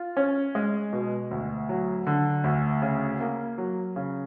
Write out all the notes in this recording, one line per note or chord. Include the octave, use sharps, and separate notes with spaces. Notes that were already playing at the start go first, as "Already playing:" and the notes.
Already playing: F4
C#4
G#3
B2
D2
F#3
D3
D2
C#3
A#3
F#3
C#3